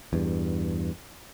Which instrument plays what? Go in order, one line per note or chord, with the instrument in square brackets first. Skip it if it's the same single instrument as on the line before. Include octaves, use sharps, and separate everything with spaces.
[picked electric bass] E2 G2